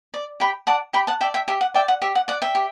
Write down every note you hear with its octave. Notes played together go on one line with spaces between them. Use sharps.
D5
G4 G5 B5
D5 F#5 A5
G4 G5 B5
F#5 A5
D5 E5 G5
E5 G5
G4 E5
F#5
D5 E5 G5
F#5
G4 E5
F#5
D5 F#5
E5 G5
G4